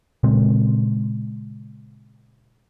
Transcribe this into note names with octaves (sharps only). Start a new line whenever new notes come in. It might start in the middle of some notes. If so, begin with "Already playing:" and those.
A#2 C#3 G#3 C4